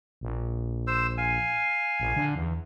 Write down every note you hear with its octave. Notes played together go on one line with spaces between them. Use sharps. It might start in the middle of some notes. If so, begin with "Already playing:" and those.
A#1
C5 E6
F5 G#5
A#1
D3
E2